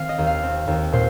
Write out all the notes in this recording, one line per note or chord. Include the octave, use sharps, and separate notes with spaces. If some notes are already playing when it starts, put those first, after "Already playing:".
Already playing: D#3 C4 F5
D#5
D#2
F5
C4
D#2
A#2 C5